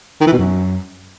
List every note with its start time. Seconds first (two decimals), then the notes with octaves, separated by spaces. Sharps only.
0.21 D#3
0.27 E3
0.32 B2
0.38 F#2